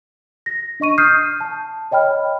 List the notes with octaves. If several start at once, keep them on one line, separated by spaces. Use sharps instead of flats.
A#6
D4 D#5 C#6 D#7
D#6 F6 G6 C7
A5
C#5 D#5 G5 B5 F6